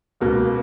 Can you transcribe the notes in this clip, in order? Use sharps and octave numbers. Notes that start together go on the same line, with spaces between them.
C#2 B2 A#3